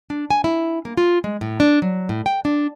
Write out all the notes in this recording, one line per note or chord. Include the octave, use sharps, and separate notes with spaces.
D4
G#5
E4
A#3
F4
G#3
A2
D4
F#3
A2
G5
D4